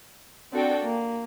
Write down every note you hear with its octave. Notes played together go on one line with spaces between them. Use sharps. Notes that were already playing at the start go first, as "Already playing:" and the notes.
C4 D4 F#4 A4 D5 G5
A#3